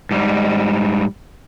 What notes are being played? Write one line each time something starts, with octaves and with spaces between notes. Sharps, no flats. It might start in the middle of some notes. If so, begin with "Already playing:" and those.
G#2 G3